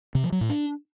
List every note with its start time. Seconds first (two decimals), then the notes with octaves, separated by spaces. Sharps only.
0.15 C3
0.24 F3
0.32 F#3
0.41 A2
0.50 D4